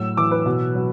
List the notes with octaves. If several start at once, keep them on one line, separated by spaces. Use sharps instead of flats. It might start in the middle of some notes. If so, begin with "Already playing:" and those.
Already playing: A2 F#3 E6
E3 D6
B4
B2
F#3